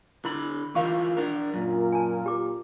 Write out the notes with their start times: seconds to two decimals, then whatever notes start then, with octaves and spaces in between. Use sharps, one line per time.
0.25 D3 E4 B5
0.75 E3 F4 A#4 F5 C#6
1.17 D4 A#4
1.54 F#2 A#2 A#4
1.92 G#5 A5
2.26 G4 D6